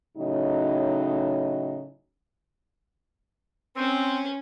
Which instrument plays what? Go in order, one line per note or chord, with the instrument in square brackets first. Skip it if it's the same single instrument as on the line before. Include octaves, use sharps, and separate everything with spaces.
[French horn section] A2 C#3 F#3 D#4
[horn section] C4 [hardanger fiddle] C#4